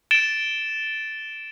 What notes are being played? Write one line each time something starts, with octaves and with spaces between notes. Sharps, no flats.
A6 D7 E7 G7